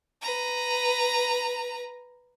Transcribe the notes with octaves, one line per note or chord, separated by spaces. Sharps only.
B4 A#5